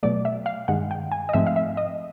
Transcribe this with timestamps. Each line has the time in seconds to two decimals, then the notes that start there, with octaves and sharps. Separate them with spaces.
0.03 B2 F#3 A3 D5
0.25 E5
0.46 F5
0.68 G2 D#3 G#3 F#5
0.91 G5
1.12 G#5
1.29 D#5
1.33 G#2 F3 A3 C4 E5
1.47 F5
1.56 E5
1.77 D#5